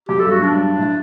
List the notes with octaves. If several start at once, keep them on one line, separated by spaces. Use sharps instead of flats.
F#2 G4
A4
G2
F#4
F#2 D4
G2
A2